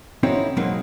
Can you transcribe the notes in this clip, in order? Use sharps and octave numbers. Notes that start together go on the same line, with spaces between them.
C4 C#4 D#4 E4 F#4 A4
B2 F#3 G#3 A#3 C4 D#4